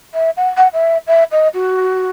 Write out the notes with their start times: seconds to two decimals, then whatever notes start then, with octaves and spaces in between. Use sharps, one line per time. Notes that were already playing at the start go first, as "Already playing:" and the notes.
0.14 E5
0.37 F#5
0.57 F#5
0.73 E5
1.07 E5
1.31 D#5
1.53 F#4